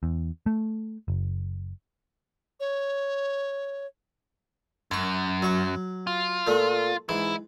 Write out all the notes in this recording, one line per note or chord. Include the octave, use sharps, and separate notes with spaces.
E2
A3
F#1
C#5
F#2 G#5 C#6
F#3 C#6
F4
A#2 A3
G#2 E3 E4